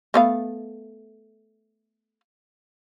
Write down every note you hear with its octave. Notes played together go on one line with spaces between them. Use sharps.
A3 B3 F5